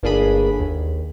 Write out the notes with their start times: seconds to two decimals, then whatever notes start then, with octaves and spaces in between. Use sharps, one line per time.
0.03 G1 A#3 D4 G#4 B5
0.60 D#2